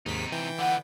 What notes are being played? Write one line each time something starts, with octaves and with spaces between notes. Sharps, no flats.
D#2 G#2 C3 D#4 B6
E3 G5
D3 B4 F#5